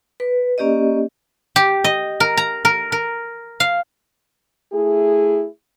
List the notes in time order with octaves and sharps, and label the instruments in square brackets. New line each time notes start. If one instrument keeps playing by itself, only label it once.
[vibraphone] B4
A#3 C#4 G4 D5 D#5
[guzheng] G4
D#5
A#4
A#5
A#4
A#4
F5
[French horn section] A3 E4 G#4